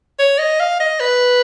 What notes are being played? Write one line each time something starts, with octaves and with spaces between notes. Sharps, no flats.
C#5
D#5
F5
D#5
B4